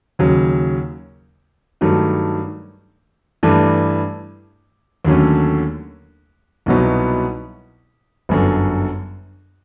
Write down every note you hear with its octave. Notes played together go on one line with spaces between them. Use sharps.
D#2 C#3 F#3
G2 D#3 F#3 A3
G2 E3 A3 D4
D#2 D3 F#3 A3 C#4
C2 B2 F#3 B3 D#4
G1 F#2 D3